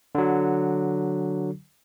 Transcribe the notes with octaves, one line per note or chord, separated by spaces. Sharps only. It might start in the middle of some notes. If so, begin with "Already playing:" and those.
D3 F#3